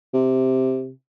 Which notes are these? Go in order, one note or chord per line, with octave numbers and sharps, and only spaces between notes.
C3